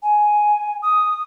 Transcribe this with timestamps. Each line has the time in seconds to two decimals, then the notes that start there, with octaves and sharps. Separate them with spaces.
0.03 G#5
0.82 D#6